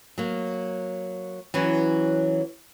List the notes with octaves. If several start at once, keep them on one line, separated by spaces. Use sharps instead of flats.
F#3 A#3
E3 F#3 C#4